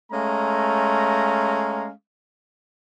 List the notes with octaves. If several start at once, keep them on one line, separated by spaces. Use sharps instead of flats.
G#3 A3 C#4 F5 A#5